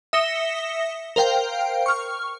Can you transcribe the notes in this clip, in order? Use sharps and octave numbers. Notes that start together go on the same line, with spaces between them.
E5 D#6 A#6 C#7 E7 G7
A#4 C5 F5 G5
C#6 F6